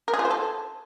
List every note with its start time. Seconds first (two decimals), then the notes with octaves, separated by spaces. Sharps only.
0.08 A#4
0.14 G#4
0.19 F4
0.25 C5
0.30 A4